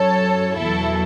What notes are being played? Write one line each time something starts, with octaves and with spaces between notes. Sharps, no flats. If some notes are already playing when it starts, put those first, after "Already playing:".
Already playing: F#2 F#3 A4 C#5
E2 B2 F#3 E4 A4